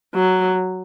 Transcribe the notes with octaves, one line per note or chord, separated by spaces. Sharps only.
F#3